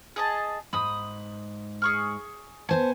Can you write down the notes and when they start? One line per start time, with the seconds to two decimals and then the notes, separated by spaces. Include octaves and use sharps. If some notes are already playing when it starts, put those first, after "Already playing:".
0.16 G#4 D#5 A5
0.73 G#2 B5 D#6
1.82 G#4 C#6 F6
2.69 B3 C5 G#5 A5